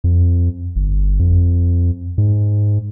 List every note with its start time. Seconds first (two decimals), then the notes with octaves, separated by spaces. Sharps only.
0.04 F2
0.76 G1
1.19 F2
2.18 G#2